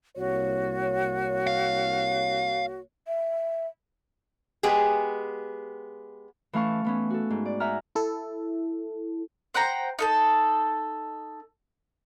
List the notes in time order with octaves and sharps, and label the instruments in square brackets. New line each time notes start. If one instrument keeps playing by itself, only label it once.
[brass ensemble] C2 A#3 C#5 [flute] F#4
[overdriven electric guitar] F5
[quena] E5
[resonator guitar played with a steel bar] G#3 B3 G4 G#4
[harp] E3 A3 C#4 F5 A5 C#6
E3 B3 C#4
F#4 A4
G#2
D5
E5 F#5 G#5 A#5 F6
[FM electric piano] E4 A4
[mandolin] C5 F#5 G5 A#5
D#4 A4 A5